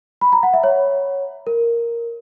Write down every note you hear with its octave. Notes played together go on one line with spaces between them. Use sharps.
B5
A#5
F#5
E5
C#5
A#4